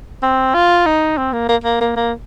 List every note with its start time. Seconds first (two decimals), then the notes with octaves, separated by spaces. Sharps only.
0.22 C4
0.54 F4
0.86 D#4
1.17 C4
1.33 A#3
1.49 A#3
1.64 A#3
1.81 A#3
1.96 A#3